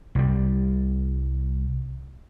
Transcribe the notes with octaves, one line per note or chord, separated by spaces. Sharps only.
C2 G3